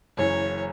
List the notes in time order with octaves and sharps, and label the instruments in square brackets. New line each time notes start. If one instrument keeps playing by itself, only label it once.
[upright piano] F#1 F#2 E3 [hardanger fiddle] C#5